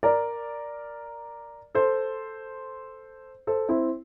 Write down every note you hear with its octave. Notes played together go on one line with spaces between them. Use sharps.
A#4 D5
A4 C5
A4 C5
C4 E4